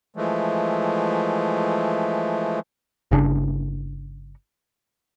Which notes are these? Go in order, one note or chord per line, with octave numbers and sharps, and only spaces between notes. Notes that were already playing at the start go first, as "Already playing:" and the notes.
E3 F3 G#3 A3
G1 C#3 D4